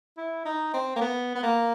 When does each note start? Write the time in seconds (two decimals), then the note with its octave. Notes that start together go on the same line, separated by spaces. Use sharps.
0.17 E4
0.45 D#4
0.74 C4
0.96 A#3
1.01 B3
1.35 B3
1.43 A#3